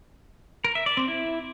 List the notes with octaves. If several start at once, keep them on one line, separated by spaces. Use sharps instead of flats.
A#4
E5
D5
C4
E4